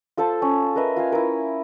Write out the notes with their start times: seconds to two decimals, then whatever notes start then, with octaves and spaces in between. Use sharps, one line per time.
0.17 F4 A4 C5 A5
0.42 C#4
0.76 A#4 B4 D#5 E5
0.96 F4 F5 G#5
1.12 E4 A#4